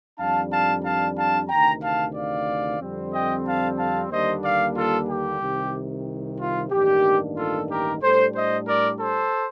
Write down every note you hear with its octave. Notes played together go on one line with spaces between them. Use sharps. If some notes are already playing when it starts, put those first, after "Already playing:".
F2 D#3 G3 D4 F5 A5
F5 A5
F5 A5
F5 A5
D2 C3 D#3 G5 A#5
F5 A5
D5 F5
F2 D3 G3 C4
D#5 G5
F5 A5
F5 A5
D#2 D3 G3 A#3 D4 C5 D#5
D5 F5
F4 A4
G4
C2 C3 D#3
F4
A1 G2 D#3 A#3 D4 G4
F4 A4
G4 A#4
A2 G3 D4 A4 C5
C5 D#5
A#4 D5
A4 C5